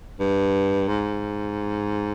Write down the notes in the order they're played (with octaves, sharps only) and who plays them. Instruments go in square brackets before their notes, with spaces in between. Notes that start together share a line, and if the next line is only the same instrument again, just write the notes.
[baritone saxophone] G2
G#2